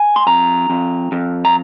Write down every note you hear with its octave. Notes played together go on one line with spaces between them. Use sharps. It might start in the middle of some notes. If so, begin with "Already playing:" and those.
Already playing: G#5
C6
F2 A#5
F2
F2
A#5